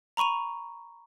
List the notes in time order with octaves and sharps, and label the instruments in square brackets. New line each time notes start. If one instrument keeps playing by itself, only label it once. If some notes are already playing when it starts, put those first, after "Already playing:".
[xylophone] A#5 B5 C#6 D#7 F7